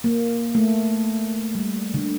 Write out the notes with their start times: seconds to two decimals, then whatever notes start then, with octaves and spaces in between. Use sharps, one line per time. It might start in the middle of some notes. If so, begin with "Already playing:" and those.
0.04 A#3
0.55 A3
1.55 G3
1.94 D3